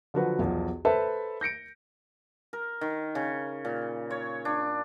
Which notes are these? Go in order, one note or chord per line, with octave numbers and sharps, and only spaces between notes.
D3 F3 F#3 F#4 B4
B1 E2 F3
A4 B4 C5 E5 A5 B5
G6 A#6 C#7 D7
A#4
D#3
C#3
A#2
C#5
D4